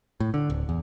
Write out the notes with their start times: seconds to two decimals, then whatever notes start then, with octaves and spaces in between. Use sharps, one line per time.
0.20 A2
0.34 D3
0.50 D1
0.69 E2